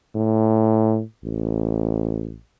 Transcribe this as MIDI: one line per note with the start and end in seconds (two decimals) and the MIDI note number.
0.16 1.02 45
1.25 2.37 33